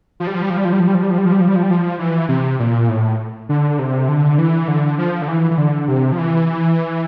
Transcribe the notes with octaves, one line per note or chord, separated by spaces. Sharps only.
F3
G3
F3
G3
F3
G3
F3
G3
F3
G3
F3
G3
F3
G3
F3
G3
F3
G3
F3
G3
F3
E3
C3
A#2
A2
D3
C3
D3
E3
D3
F3
D3
E3
E3
D3
C3
F3
E3